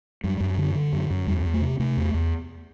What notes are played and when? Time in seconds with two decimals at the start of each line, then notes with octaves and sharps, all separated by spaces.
0.24 F#2 G3
0.40 F#2
0.58 D3
0.75 D3
0.93 F#2
1.10 F#2
1.27 E2 G3
1.45 E2
1.54 A3
1.61 C3
1.79 C3 A3
1.97 E2
2.14 E2